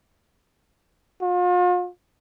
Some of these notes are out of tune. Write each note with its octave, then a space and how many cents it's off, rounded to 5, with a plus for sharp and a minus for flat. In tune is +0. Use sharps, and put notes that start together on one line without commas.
F4 +40